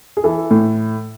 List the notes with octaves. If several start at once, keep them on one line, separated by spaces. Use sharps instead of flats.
G#4
E3 A4
A2